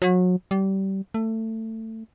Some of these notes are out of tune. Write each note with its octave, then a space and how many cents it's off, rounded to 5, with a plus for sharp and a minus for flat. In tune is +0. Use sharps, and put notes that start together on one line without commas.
F#3 -30
G3 -25
A3 +20